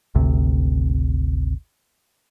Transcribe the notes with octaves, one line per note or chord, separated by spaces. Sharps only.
G#1 D2 C3